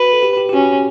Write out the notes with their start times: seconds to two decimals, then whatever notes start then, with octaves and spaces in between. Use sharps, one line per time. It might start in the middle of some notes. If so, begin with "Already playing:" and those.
Already playing: F#4 B4
0.13 A4
0.23 G4
0.37 G4
0.49 G4
0.53 C#4 F#4